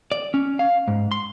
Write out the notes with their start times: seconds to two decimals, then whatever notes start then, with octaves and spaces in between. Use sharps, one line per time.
0.12 D5
0.34 C#4
0.59 F5
0.88 G#2
1.12 C6